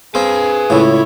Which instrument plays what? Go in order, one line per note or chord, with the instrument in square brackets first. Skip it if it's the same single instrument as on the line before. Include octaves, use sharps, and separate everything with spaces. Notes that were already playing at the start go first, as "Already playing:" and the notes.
[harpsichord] C4 [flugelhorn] G#4 [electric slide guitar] B4 F5
[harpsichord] C#2 A2 [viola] E4 C#5